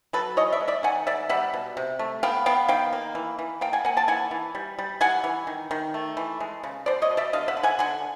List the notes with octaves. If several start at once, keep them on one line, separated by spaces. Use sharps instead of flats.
F#3 A4 B4
E3 C#5 D#5
D5 E5
G#3
D5 E5
D#3 F#5 G#5
G3 D5 E5
G3 E5 F#5
B2
C3
A3
B3 F5 G5
B3 F5 G5
D#3 F5 G5
A#3
E3
E3
A#3 F5 G5
F#5 G#5
A#3 F#5 G#5
G5 A5
E3 F#5 G#5
E3
G3
G3
E3 F#5 G#5
E3
D#3
D#3
A3
E3
G#3
C#3
B2 C5 D5
C#5 D#5
B2
D5 E5
D3 D#5 F5
E5 F#5
D3
F#5 G#5
D3 F#5 G#5